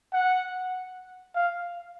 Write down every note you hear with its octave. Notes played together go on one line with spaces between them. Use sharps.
F#5
F5